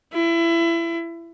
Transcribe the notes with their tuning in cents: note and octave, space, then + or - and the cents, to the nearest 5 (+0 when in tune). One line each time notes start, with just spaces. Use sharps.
E4 +25